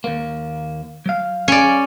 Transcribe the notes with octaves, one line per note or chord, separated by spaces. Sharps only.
D#2 A#3
F#3 F5
C#4 D5